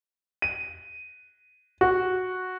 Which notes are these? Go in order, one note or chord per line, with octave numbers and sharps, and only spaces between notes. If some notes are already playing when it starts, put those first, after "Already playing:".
D#7
F#4